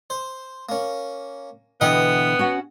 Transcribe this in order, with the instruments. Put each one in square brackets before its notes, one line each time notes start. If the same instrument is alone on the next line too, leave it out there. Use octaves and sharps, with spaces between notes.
[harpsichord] C5
A#3 C#4
[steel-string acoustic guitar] B2 D3 E3 [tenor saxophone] B3 [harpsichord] D#5 G5
[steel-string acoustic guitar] C#4 F#4 F#5